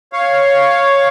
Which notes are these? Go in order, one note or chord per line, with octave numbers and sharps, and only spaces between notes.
C#5 F5